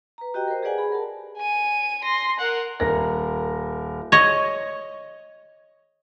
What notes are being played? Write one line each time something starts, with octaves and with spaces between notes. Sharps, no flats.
B4 A#5
F#4 G4 D#5 G5 A#5
A#4 C5
G4 G#4 B4 D5 F#5 G#5
G#4 B5
A#4 A5
G#5 D#7
C6 A#6
A#4 F#5
D#1 A#4 A#6
C#5 D#5